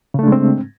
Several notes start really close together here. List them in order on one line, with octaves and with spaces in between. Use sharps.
C#3 A3 D4 G#3 C4